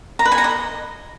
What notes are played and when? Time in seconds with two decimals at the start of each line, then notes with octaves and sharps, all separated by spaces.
0.19 A#5
0.25 B4
0.32 G#5
0.38 A#5
0.44 D#5